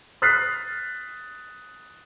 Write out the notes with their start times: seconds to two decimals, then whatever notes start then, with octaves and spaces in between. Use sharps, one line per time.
0.22 D#6 F6 F#6 A6 B6 C7